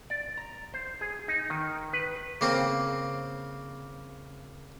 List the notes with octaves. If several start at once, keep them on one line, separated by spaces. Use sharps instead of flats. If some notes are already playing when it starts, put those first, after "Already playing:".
D5
A#5
C5
G#4
D#4
D#3
B4
C#3 A#3 C4